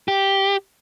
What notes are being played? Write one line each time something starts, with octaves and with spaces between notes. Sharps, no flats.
G4